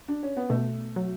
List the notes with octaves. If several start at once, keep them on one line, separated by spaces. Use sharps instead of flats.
D4
C#4
B3
B2 A3
F#3